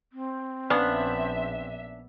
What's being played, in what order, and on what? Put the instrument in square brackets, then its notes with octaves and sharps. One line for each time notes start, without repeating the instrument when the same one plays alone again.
[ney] C4
[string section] A#1 E5 [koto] B3 [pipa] C#4 D4 F5